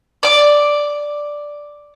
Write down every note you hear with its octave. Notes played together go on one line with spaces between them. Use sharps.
D5 D6